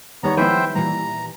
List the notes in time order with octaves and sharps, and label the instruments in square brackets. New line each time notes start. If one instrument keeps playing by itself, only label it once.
[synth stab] D#2 [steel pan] D#3 G3 C#5 [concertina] B3 A#5
[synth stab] F3 G#3 [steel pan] B3 E4 B4 [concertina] C5 E5 G5
[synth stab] A#2 E3 G3 [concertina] A#5